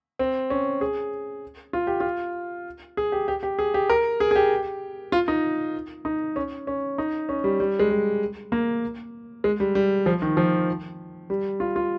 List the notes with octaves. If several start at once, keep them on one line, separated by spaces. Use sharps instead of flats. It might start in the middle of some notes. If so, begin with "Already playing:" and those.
C4
C#4
G#4
F4
G4
F4
G#4
G4
G4
G4
G#4
G4
A#4
G#4
G#4
G4
F4
D#4
D#4
C#4
C#4
D#4
C#4
G3
G3
G#3
G3
A#3
G#3
G3
G3
F3
D#3
F3
G3
F4
F4